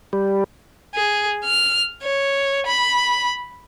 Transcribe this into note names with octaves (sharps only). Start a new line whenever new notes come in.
G3
G#4
F6
C#5
B5